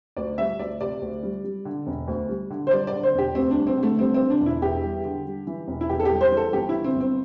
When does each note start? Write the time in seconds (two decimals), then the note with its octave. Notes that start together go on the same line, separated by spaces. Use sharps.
0.17 D2 D5
0.38 G3 E5
0.59 D2 D5
0.80 C3 D5
1.02 D2
1.23 G3
1.44 G3
1.65 D3
1.87 E1
2.08 D2
2.29 G3
2.50 D3
2.67 C5
2.71 G3 D5
2.87 D3 D5
3.03 C5
3.14 E1 G4
3.35 D2 C4
3.51 D4
3.56 G3
3.67 C4
3.77 D3
3.83 A3
3.99 G3 C4
4.14 C4
4.20 D3
4.30 D4
4.41 E1
4.46 E4
4.62 E2 G4
4.83 G3
5.05 D3
5.26 G3
5.47 E3
5.68 E1
5.81 E4
5.89 E2 G4
6.00 A4
6.05 G4
6.10 G3
6.21 C5
6.32 E3
6.37 A4
6.53 G1 G4
6.69 D3 E4
6.84 C4
6.96 G1 C4